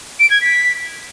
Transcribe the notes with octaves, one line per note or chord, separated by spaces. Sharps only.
D7
G#6
B6